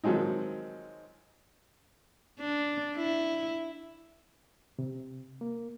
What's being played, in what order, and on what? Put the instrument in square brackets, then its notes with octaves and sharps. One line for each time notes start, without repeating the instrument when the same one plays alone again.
[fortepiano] D#3 F3 F#3 G#3 C4 D#4
[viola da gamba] D4
E4
[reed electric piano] C3
A#3